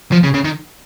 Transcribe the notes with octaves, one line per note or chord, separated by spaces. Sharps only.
F3
C#3
C#3
D#3